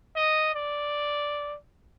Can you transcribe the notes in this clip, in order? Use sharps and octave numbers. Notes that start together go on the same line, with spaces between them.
D#5
D5